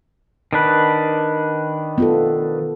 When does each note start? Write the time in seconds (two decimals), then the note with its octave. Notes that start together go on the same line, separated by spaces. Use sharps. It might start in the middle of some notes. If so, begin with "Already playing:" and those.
0.53 D#3 D4 B4
1.98 B3 F4 A4